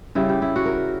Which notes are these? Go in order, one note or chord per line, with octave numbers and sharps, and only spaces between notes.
C#3 G3 E4
G4
E4
F#4
A#4